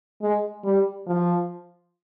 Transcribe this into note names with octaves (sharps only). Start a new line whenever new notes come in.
G#3
G3
F3